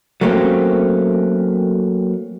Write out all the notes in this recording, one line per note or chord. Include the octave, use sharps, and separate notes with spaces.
F#3 A3 A#3 C4 C#4 G4